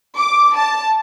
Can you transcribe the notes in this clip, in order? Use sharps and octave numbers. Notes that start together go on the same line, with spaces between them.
D6
A5